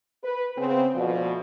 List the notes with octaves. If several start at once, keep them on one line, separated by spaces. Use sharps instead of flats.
B4
C#3 B3 C4
D2 B2 F3